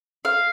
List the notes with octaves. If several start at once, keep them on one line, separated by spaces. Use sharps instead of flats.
F5